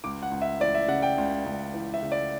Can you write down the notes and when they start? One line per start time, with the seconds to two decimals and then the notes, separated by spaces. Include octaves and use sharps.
0.04 C#2 D6
0.23 F#5
0.31 C#2
0.41 E5
0.60 E3 D5
0.75 E5
0.88 C#3 F#5
1.02 G5
1.18 C#2
1.46 C#2
1.74 E3
1.94 E5
2.02 C#3
2.12 D5